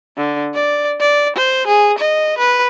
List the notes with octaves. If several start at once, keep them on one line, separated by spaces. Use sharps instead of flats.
D3
D5
D5
C5
G#4
D#5
B4